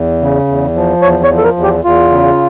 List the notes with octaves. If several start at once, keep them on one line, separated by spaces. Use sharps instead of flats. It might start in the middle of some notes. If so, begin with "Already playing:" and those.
Already playing: E2
C#3
E2
F3
E2 C#5
C#5
F3
A4
A#4
E2
G4
E2 F4
C#3